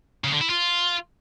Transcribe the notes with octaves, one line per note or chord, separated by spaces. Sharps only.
C#3
D3
E4
F4